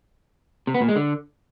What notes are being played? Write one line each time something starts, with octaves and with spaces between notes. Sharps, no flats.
C3
B3
A#2
G#3
D3